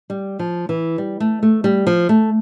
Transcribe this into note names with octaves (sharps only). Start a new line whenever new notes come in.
G3
F3
E3
G3
A3
A3
G3
F3
A3